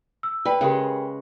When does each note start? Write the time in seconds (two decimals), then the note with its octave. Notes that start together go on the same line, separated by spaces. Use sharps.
0.23 E6
0.45 B4 D5 G5
0.61 C#3 G#3 G4 A#4 G5